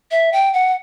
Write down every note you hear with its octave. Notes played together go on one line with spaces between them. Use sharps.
E5
G5
F#5